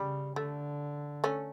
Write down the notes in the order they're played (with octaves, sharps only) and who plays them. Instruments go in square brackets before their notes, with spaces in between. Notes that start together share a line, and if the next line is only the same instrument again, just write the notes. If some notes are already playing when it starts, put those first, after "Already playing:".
Already playing: [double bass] C#3 [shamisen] G3
[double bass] D3 [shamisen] A3
[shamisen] A3 C#4